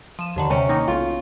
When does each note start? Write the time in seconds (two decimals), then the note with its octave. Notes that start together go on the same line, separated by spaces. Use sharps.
0.19 F3 D#7 E7
0.36 D#2 D3 D#3
0.50 C3 C#4 D7
0.69 D#3 A#3 D#4
0.88 B1 F4